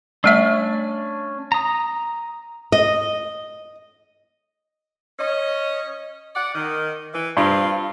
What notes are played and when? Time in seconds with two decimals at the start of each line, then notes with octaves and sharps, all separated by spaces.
0.24 G3 A3 C#4 D4 E5
1.52 A#5 D#6
2.72 D#5
5.19 C#4 C#5 D#5
6.35 D5 F#5
6.55 D#3
7.13 E3
7.37 G2 C4 F4